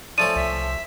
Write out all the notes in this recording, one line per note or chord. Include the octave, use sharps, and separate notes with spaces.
F3 A3 C#4 D5 D#7
C2 E5